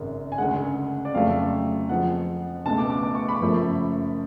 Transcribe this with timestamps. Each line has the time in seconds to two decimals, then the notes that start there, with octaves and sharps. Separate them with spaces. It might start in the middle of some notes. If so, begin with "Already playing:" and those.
Already playing: G#1 F#2 C#3
0.32 G#5
0.38 D2 C#3 G#3 F#5
1.05 D5
1.14 F2 C#3 F#3 A3 F5
1.89 F2 F3 G#3 F#5
2.65 C#2 B2 A3 A5
2.78 D6
2.90 D6
3.03 D6
3.15 C#6
3.29 B5
3.41 F#1 F#2 F3 A3